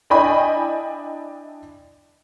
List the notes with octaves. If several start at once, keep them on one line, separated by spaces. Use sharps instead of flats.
D4 E4 D#5 G5 G#5 B5